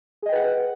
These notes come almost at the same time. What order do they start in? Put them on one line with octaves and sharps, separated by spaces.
G#4 D#5 G5 B4 F#5